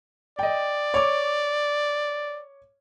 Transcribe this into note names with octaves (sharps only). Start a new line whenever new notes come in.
D5 D#5 G5
C#5 D6